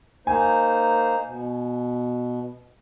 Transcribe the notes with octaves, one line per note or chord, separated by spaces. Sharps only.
A#3 D#4 C5 G#5
B2